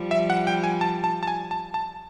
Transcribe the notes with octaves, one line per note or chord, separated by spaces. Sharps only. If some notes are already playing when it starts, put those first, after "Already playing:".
Already playing: F3 G3
E5
F#5
G5
G#5
A5
A5
A5
G#5
A5
A5